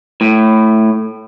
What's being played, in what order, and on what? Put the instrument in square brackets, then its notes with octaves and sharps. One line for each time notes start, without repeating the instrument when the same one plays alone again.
[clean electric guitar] A2